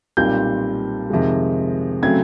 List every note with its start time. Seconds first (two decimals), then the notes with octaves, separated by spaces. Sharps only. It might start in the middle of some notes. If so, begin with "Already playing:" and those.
0.17 B1 A#2 G3 C4 G6
1.10 F2 C3 D#3 G#3
2.02 C#3 F#3 A3 C4 G#6